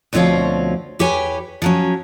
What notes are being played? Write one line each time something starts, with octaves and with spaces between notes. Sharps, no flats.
D2 B2 F3 C4 C#5 F5
E2 G4 B4 C#5 G#5
F3 F#3 C#4